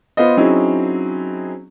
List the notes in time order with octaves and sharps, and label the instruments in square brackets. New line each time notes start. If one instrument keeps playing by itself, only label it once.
[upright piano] B3 F4 C5 D#5
F#3 C4 C#4 D#4 E4 G#4